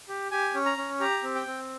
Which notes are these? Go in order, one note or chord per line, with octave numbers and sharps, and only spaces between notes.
G4
G4 G#5
C#4
A#5
C#4
G4 A#5
C4
G5
C4